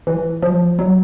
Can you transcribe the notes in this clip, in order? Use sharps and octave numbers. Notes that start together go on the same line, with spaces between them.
E3
F3
F#3